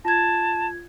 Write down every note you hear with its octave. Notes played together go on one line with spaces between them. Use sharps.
F4 A5 G#6